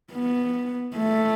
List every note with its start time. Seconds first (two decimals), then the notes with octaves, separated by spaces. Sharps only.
0.13 B3
0.96 A3